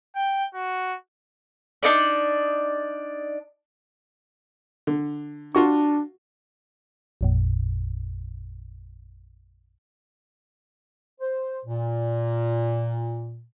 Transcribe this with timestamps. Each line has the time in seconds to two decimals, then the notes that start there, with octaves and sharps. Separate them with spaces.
0.16 G5
0.54 F#4
1.83 D4 D#4 A#4 D5
4.87 D3
5.55 D4 F4 F#4 C#6
7.21 A1 F2 A#2
11.21 C5
11.66 A#2